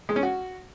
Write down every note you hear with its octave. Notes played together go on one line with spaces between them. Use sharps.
G#3
C#4
F#4